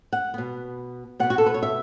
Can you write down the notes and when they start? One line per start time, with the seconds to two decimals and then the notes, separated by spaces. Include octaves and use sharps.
0.13 F#5
0.34 B2 B3
1.20 B2 B3 F#5
1.30 F#4
1.38 A4
1.46 B4
1.54 C#5
1.63 E5